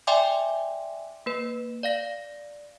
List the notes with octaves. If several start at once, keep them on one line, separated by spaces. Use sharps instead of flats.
D5 E5 G5 G#5 C6 D6
A#3 B4
D5 F5 A#6